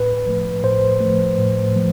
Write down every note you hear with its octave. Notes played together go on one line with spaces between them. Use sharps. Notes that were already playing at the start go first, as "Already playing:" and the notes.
Already playing: A2 B4
F3 A3
A2 C5
A3
F3
A2
F3 A3